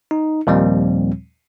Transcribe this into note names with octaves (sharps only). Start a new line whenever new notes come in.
D#4
D#2 A#2 F3 G3 C4